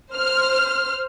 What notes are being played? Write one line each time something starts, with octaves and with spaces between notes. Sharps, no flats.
C5 F6